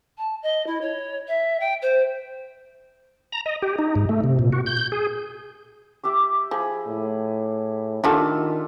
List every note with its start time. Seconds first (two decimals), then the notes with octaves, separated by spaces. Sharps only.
0.18 A5
0.42 D#5
0.66 E4
0.81 C#5
1.28 E5
1.60 G5
1.82 C5
3.32 A#5
3.46 D#5
3.62 G4
3.79 D#4
3.96 G#2
4.09 A3
4.24 C3
4.39 A#2
4.53 F#4
4.66 G6
4.92 G#4
6.04 G4 E5 D6
6.51 F3 G#4 B5
6.87 A2
8.04 D#3 G3 D4 F4 F#4 A4 E5